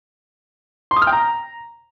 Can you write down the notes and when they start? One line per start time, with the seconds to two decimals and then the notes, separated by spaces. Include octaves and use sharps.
0.91 C6
0.96 D#6
1.02 F6
1.07 G5
1.13 A#5